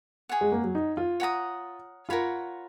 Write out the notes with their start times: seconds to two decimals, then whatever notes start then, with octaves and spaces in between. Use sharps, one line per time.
0.29 G#4 C#5 F#5
0.41 G#3
0.52 A#3
0.64 F#3
0.75 D#4
0.97 F4
1.20 C#5 F#5 A#5 D#6
2.09 F4 A#4 C#5 F#5 B5